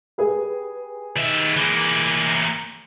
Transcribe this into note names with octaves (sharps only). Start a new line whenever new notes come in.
G4 G#4 B4
D#3 E5
E3 A#3